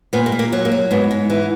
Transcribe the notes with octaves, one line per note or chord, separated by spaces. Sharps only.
A#2 B3
A#3
A#2
A#3
F#3
A#3
F#3
G#2 B3
G#2
E3